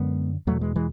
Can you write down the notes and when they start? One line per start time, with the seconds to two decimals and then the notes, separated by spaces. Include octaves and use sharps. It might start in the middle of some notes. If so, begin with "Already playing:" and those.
Already playing: F#2 D3 G#3 B3
0.47 E2 B2 F#3 A3
0.61 E3 G#3
0.76 E3 G#3